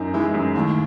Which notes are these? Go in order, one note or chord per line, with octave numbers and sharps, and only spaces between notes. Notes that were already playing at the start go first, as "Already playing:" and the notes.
Already playing: F#2 D#4
E3 G#3
F#2
D#2 A2